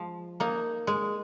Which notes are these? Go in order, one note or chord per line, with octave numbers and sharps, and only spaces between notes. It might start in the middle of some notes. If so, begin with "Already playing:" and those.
Already playing: F3 G#3
A#3 D#4
G#3